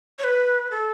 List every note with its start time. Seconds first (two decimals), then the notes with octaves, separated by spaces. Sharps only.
0.19 C#5
0.24 B4
0.71 A4